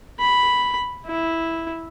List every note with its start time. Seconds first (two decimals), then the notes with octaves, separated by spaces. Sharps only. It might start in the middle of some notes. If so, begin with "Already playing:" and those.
0.19 B5
1.07 E4